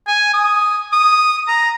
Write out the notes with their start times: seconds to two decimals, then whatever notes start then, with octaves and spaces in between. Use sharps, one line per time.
0.07 G#5
0.34 D#6
0.92 D#6
1.48 A#5